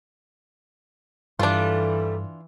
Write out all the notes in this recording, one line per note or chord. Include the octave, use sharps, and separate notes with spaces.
G2 E3 G3 A3 D4 F4